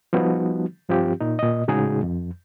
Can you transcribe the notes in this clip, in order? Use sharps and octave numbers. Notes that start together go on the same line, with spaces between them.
F3 G3 B3 D#4 F#4
G2 F3 C4 F4 G4
A#2 D#4
A#2 D#5
A2 C#3 G#3 D#4 F#4 G#4
F2